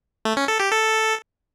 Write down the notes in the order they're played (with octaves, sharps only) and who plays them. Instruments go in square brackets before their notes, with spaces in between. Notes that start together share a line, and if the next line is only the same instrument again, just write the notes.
[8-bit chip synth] A3
C#4
A4
G4
A4